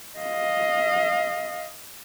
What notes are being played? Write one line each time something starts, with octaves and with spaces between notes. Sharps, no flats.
D#5 F5